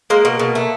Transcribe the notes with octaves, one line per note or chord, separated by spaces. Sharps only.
G#3 A#3
B2
B2
A3